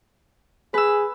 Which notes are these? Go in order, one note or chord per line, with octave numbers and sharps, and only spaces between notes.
G#4 B4 E6